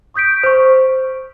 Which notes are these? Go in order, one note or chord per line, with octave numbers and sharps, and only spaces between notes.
C#6 D#6 G6 B6 D7
C5 C#6